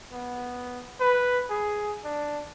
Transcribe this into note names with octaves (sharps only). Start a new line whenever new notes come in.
B3
B4
G#4
D4